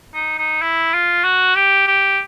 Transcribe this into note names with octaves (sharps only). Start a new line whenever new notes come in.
D#4
D#4
E4
F4
F#4
G4
G4